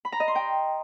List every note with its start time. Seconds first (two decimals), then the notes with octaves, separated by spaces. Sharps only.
0.05 B5
0.12 A#5
0.20 D#5
0.28 C6
0.35 G5